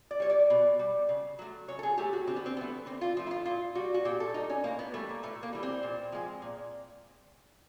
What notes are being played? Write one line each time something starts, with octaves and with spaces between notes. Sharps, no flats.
D5
G3 C#5
D5
B2
G3
C#3
F#3 A3
C#3 C#5
A4
G#4
F#3 A3 G4
F#4
D3 C4
B3
C4
F3 A3 B3
D3 C4
F4
F3 A3 F4
E4
F4
A#2 F4
G3 F#4
F#4
A#2 G4
A4
G3 D#4
C#4
A2 A#3
B3
E3 G3 A3
A#3
A2 A3
A#3
E3 G3
C4
A#2
F3 G#3
A#2